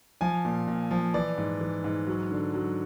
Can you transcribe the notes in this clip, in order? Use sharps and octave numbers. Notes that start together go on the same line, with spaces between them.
F3 G#5
A#2
A#2
F3
E3 D5
G#2
E3
G#2
F#3
D3
F#3